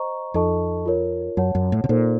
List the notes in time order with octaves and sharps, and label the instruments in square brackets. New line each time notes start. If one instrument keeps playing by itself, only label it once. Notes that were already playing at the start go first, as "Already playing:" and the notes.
Already playing: [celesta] C5 D#5 A#5 C#6
[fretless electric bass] F2 [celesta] D#4 A4 D#5 A5 C#6
[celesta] F4 A#4 C#5
[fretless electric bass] F#2 [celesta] C#5 F#5 A5
[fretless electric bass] F#2
A2
C3
[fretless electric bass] A#2 [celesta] D#4 A4 C5